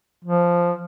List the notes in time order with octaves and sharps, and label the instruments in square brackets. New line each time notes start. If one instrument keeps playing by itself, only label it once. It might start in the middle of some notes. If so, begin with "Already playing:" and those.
[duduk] F3